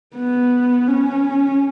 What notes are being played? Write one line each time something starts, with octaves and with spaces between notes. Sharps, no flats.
B3
C#4